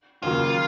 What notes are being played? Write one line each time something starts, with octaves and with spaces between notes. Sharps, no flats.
D#2 C#3 F#3 A#3 F4